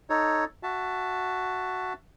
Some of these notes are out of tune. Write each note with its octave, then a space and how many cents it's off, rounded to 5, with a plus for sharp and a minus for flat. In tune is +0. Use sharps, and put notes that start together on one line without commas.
D#4 +0 A4 +0 C#5 +0
F#4 +0 E5 +20 A5 +0